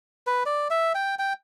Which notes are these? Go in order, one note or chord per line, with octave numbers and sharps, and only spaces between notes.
B4
D5
E5
G5
G5